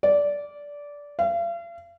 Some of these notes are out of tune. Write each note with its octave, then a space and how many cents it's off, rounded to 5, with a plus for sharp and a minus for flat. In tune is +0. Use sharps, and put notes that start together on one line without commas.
D5 -15
F5 -40